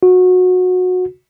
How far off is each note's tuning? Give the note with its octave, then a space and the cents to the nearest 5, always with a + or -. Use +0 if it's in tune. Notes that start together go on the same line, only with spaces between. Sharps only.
F#4 -20